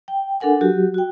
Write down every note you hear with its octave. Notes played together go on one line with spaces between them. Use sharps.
G5
D4 A4 A#4 F#5 G#5
F#3 F#4 G4
F#4 G5